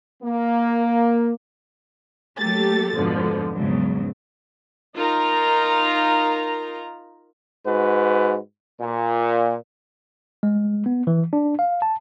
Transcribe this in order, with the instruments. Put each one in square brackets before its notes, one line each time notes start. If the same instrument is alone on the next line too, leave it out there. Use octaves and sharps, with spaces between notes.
[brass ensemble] A#3
[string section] F#3 A3 A#3 G4 A4 A6
F2 G#2 B2 D3 F3
E2 G#2 C#3 F#3
[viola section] D#4 F4 A#4 A#5
[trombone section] G#2 F#4 B4
A#2
[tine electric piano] G#3
B3
E3
D4
F5
A5